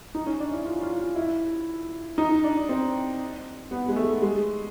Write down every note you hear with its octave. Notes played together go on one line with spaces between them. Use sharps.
D#4
C#4
D4
E4
F4
F4
F4
E4
D#4
D4
C4
B3
G#3
A3
G#3